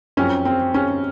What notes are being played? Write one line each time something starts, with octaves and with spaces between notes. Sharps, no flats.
F#2 F3 C4 C#4
C4
C#4